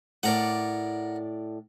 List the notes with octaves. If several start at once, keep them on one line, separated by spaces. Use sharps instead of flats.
A2 A#4 D5 F#5